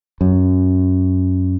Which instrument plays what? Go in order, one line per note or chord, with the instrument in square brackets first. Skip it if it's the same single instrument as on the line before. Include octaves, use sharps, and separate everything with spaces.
[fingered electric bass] F#2